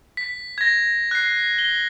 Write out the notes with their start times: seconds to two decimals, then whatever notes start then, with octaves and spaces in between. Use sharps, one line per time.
0.17 B6
0.58 G#6 A#6
1.11 F#6 C7
1.59 G7